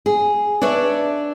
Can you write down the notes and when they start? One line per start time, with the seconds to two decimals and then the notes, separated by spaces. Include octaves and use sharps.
0.06 G#4
0.62 D4 B4 C#5 D5 E5